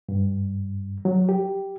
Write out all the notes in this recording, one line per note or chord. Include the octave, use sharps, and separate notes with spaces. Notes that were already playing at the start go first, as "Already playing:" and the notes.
G2
F#3
G4